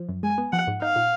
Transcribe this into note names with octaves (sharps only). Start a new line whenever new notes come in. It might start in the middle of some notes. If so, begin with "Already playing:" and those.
Already playing: F3
F#2
G#3 G#5
B3
F3 F#5
G#2
D#4 F5
A#2